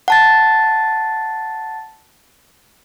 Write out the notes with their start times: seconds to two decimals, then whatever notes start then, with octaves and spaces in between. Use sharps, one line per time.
0.08 F#5 A5 A6